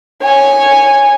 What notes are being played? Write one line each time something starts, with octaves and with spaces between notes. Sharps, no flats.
C#5 G#5